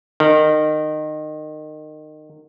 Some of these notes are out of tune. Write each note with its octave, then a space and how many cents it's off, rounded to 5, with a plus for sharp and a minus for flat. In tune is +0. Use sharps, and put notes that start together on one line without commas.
D#3 -25